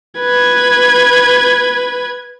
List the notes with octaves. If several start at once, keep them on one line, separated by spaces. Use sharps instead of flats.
B4 G#6